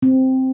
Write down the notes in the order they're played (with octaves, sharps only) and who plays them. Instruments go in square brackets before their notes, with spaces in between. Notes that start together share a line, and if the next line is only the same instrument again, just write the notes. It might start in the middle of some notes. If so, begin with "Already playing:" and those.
[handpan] C4